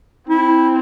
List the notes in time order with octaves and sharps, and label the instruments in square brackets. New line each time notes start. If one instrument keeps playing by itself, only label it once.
[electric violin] C4 [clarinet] E4